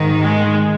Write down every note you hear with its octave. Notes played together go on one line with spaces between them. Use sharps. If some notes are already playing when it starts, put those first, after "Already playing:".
Already playing: G#2 D#3
G#3